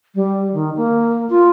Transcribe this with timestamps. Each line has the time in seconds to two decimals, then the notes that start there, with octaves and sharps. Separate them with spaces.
0.15 G3
0.53 D#3
0.77 A#3
1.30 F4